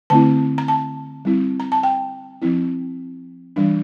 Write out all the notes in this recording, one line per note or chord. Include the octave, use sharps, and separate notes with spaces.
D3 A3 C4 E4 A5
A#5
A5
G3 C4 E4
A#5
A5
G5
F3 C4 E4
E3 G3 D4